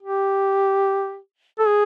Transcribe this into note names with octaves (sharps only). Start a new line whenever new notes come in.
G4
A4
G#4